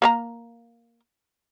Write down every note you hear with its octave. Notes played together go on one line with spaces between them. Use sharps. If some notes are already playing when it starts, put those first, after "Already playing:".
A#3 C#5 A#5